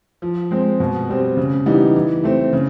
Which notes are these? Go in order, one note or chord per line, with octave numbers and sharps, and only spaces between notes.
F3
G#3 C4
B2
G3 C4
C#3
E3 G3 B3 D#4
E3
A3 C4
C#3